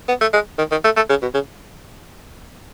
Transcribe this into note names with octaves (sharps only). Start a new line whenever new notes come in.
B3
A3
G#3
D#3
D#3
A3
A3
C#3
B2
C#3